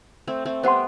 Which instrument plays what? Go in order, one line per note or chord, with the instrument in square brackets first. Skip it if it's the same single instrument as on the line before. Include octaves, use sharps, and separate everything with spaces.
[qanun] A3 C4
A3 C4
[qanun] G3 B3 [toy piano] C5 F#5 C6